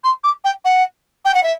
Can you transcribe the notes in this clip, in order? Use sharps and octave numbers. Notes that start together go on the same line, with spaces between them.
C6
D6
G5
F#5
G5
F#5
E5